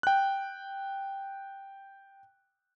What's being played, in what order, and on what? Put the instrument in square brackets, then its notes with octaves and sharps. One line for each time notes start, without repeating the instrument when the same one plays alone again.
[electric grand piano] G5 F#6